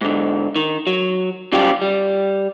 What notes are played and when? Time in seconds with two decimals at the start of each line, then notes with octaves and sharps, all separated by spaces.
0.01 G#2 D3
0.56 D#3
0.87 F#3
1.52 C#3 F#3 G3 F4 G4
1.82 G3